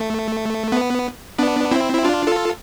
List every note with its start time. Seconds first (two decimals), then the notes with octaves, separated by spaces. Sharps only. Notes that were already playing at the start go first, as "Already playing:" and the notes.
Already playing: A3
0.72 B3
1.38 B3 D4
1.72 C4 E4
1.94 E4
2.04 D4 F4
2.27 F4 A4